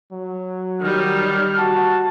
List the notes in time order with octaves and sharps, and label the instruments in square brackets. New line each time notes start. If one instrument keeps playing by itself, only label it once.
[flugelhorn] F#3
[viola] D#3 G3 [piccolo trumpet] F6
[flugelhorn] F#4 [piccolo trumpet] A5